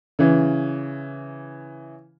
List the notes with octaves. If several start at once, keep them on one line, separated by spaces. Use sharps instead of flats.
C#3 E3